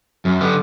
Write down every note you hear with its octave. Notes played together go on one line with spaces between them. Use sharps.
F#2 F#3
D3 G3 B3